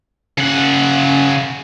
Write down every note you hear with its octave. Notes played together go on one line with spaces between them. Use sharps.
C#3 F#5